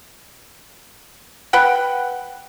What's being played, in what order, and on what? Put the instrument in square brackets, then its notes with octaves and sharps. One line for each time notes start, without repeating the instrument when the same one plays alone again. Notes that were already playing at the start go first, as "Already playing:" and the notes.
[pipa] B4 F#5 G5